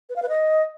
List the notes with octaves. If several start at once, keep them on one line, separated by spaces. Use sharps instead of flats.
B4
F5
B4
D#5